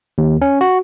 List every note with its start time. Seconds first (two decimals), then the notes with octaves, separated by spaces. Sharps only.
0.18 D#2
0.42 C#4
0.61 F#4